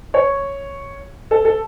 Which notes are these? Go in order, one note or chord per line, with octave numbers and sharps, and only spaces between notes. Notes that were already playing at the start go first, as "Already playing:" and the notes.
C#5
A4
A4